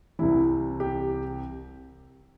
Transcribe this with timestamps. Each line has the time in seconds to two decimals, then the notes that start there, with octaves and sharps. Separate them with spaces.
0.19 C2 C3 E3 E4
0.80 G4